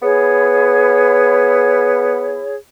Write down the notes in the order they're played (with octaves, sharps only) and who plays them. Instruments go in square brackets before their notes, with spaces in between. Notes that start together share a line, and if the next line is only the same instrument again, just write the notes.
[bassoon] B3 [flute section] E4 G#4 C#5